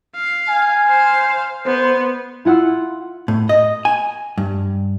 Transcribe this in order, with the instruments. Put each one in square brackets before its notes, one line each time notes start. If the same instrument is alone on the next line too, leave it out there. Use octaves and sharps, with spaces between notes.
[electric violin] F5
[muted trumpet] G#5
[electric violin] C5 F5
[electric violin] B3 [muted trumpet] C5
[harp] E4 F4 F#5 E6
[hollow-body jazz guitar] A2
D#5
G#5
G2